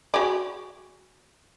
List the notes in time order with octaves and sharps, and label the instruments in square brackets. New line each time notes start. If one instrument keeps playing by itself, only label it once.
[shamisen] F#4 G#4 D5